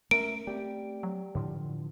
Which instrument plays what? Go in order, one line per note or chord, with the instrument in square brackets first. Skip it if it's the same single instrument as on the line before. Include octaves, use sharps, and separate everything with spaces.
[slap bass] A3 C#4 [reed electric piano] A#4 E5 [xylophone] D7
[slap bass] A3 C4 [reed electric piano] G4 D5 G5
[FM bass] F#3
[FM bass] A2 [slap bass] D3 E3 F3